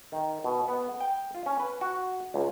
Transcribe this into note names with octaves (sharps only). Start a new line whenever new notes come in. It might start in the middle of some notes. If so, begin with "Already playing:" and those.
D#3
B2
B3
G5
F4
C#4
B4
F#4
C#2